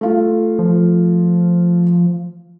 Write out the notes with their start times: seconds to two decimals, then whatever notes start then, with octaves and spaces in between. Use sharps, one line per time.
0.01 A3 F4
0.59 F3